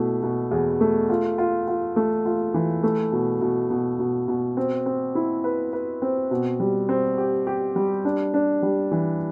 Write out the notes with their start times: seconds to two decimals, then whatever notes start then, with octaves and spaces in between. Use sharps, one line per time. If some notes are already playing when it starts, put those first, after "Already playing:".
Already playing: B2 A3 E4
0.23 B2
0.51 E2
0.81 A3
1.09 F4
1.38 F4
1.68 F4
1.96 A3
2.26 F4
2.54 E3
2.83 A3
3.12 B2
3.41 B2
3.70 B2
3.99 B2
4.28 B2
4.57 C4
4.86 C4
5.15 E4
5.44 B4
5.73 B4
6.02 C4
6.31 B2
6.60 G3
6.89 C4
7.18 G4
7.47 G4
7.76 G3
8.05 D4
8.34 D4
8.63 G3
8.91 E3